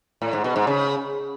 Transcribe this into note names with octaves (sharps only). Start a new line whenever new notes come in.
A2
G#2
B2
G#2
C#3